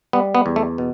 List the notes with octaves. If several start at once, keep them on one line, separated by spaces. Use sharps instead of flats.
G3 B3
B3
E2
A3
B2